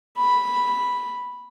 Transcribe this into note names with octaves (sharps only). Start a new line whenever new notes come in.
B5